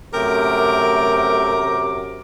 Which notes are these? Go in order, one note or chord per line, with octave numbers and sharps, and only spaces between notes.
F#2 C3 A3 A#4 G5 D6